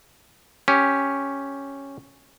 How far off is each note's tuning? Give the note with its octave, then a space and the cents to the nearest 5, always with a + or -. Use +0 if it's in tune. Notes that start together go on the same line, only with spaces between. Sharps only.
C#4 +0 G4 +0